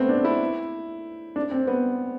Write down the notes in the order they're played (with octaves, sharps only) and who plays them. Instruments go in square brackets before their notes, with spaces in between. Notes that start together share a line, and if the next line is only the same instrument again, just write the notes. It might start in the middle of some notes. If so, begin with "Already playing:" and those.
Already playing: [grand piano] A3 B3 C4
D4
E4
D4
C4
B3